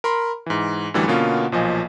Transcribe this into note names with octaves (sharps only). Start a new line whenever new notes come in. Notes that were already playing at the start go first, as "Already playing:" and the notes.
A#4 B5 C6
G#2 E3
F#2 D3 E3 G3 A3
B2 D3 A#3 B3 C#4 F4
B1 A#2 F3 D#5 G#5